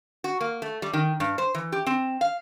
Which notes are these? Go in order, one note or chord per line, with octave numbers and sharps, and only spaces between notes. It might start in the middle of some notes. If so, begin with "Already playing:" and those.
F#4
A#3
A3
G3
D#3
G2
C5
E3
G4
C4
F5